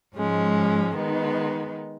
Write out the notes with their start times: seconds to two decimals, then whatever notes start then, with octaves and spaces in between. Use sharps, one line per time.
0.16 G#2 F3 G#3 C#4
0.95 D#3 G#3 B3 D#4